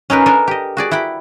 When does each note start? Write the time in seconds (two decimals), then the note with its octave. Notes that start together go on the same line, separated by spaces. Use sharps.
0.10 C#4 D#4 A#4 B4
0.26 D4 A4 A#4 D#5 G#5
0.47 G4 D#5
0.77 F#4 G#4 D5
0.91 E4 F#5 G5 B5